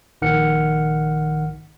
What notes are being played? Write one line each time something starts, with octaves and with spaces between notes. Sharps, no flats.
A#1 D#3 F#5 F6 C#7